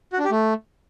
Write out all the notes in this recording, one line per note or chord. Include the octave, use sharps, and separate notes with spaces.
F#4
D4
G4
A3